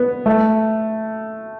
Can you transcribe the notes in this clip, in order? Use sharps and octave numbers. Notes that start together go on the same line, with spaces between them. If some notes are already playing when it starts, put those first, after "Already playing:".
Already playing: B3
A3